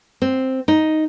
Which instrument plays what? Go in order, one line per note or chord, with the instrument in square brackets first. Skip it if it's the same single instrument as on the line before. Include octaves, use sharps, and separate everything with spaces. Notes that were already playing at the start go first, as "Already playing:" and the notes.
[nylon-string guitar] C4
D#4